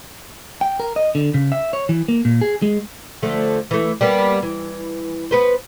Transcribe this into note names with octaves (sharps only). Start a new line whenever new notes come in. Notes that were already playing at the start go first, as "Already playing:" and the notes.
G5
A#4
D#5
D3
C#3
E5
C#5
E3
A#3
A#2
G#4
G#3
D3 F3 A3
E3 A3
G3 A#3 B3
E3
B3 B4 C5